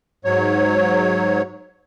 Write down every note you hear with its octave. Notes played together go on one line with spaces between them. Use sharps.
G#2 F#3 C#5